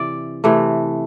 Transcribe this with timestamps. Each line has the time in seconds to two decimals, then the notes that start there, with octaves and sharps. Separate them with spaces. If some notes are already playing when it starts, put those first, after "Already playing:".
Already playing: C3 E3 D5 E5
0.44 C3 E3 A3